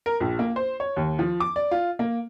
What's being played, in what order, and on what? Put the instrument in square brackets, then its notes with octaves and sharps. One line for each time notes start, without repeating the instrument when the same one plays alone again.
[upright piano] A#4
A#1
A#3
C5
C#5
D#2
F3
D6
D5
F4
A#3